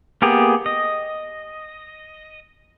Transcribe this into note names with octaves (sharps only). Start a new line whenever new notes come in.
A#3 B3 G4 G#4
D#5